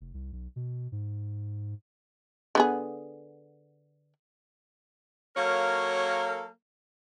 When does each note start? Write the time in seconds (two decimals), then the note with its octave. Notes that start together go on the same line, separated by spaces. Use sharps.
0.01 F1
0.14 C2
0.32 B1
0.56 B2
0.92 G#2
2.55 D3 B3 G#4
5.36 F#3 A#3 A4 A#4 C#5 F5